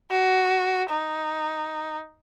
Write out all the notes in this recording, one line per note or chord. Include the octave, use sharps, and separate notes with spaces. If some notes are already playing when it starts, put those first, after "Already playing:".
F#4
D#4